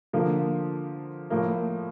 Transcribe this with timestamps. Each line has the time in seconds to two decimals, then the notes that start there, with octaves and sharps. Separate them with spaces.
0.13 D3 F3 A#3
1.30 A2 F3 A#3